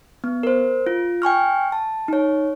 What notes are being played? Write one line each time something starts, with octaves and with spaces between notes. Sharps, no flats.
B3
A#4 C5
F4
G5 G#5 C#6 F6
A5
D#4 C#5